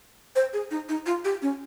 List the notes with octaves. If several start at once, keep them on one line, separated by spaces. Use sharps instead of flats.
C5
G#4
D#4
D#4
F4
G4
C#4